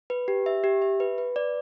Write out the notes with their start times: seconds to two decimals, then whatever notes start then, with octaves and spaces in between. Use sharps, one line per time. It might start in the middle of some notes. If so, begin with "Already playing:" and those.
0.10 B4
0.28 G4
0.46 E5
0.64 G4
0.82 E5
1.00 B4
1.18 B4
1.36 D5